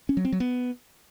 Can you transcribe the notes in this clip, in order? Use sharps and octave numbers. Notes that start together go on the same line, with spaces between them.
C#4
F#3
C4
F#3
B3